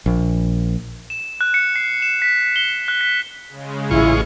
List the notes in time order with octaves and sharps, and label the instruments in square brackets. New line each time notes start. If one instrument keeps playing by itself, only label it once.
[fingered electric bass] A#1
[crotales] E7
F#6
C#7
C7
E7
B6
G7
F#6
B6
[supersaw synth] C#3 G#3
[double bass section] A1 [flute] E4 [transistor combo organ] F4 G#4 C#6